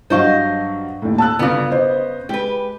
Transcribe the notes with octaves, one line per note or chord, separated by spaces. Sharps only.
G2 F#3 C5 D#5 F5 C#6
D#2 A2
A5 E6 F#6
G1 C#3 B3 F4 D6
C5 D#5
G#3 G4 B4